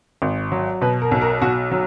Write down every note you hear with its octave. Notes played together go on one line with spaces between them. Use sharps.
G#1
F#3
B2 B4
A#4
B1
A#4
B1 F#4
F#3